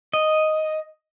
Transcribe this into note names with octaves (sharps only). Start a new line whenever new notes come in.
D#5